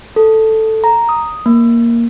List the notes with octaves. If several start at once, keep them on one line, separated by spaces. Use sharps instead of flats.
A4
A#5
D#6
A#3